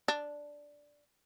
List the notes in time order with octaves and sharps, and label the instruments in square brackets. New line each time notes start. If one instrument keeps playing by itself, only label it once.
[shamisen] D4